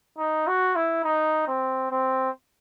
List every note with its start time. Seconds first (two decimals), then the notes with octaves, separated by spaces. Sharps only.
0.18 D#4
0.47 F#4
0.75 E4
1.04 D#4
1.47 C4
1.91 C4